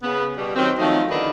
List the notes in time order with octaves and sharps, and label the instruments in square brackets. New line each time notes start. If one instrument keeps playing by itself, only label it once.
[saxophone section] C#3 B3
B2 G3
F#2 D#3 F#3 C4
D#3 F3 F#3 A3 C4 D#4
E2 D3 D#3 D4 B4 D#5